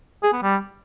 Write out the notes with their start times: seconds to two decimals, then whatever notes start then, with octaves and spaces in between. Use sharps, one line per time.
0.23 G#4
0.33 B3
0.43 G3